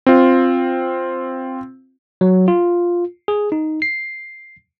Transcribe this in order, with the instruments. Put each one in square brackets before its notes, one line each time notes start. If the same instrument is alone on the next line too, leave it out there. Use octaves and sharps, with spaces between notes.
[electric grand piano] C4 F4
[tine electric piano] F#3
F4
G#4
D#4
C7